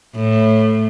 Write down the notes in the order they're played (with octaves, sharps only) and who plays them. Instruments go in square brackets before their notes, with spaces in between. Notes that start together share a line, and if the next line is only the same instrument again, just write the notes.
[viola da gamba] A2